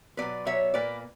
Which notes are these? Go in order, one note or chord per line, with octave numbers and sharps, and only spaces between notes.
B2 F#3 B3 B4 D5
B2 F#3 B3 C#5 E5
A#2 A#3 B4 D5